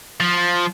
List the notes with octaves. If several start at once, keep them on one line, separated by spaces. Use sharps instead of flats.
F3